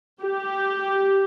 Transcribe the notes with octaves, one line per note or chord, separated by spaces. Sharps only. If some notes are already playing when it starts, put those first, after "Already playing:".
G4